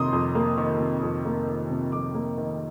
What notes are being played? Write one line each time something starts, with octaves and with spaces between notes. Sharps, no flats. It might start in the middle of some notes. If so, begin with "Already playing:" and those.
Already playing: F2 C3 D#3 A#3 A#5 C6 D#6
F2
A#3
D#3
C3
F2
A#3
D#3
C3
F2 D6
A#3
D#3